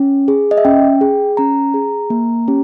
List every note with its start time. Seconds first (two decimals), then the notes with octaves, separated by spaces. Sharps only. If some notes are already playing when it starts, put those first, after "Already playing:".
Already playing: C#4
0.28 G#4
0.51 D#5
0.58 E5
0.65 C#4 G5
1.01 G#4
1.37 C#4 A#5
1.74 G#4
2.10 A#3
2.48 C#4 G4